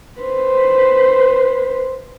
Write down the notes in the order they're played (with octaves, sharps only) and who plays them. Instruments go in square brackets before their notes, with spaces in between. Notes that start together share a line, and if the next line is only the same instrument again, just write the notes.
[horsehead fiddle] B4 C5